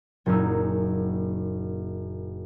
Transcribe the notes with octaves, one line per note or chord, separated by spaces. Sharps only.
F#1 F#2 A#2 C#4 D#4 E6